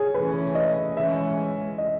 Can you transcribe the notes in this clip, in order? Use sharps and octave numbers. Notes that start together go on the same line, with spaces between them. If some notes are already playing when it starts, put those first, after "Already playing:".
Already playing: G#4 C#5
E3 A3 C#4 B4
D#5
E3 G#3 C#4 E5
D#5